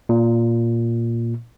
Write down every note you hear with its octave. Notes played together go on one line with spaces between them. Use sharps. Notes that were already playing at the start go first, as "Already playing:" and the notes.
A#2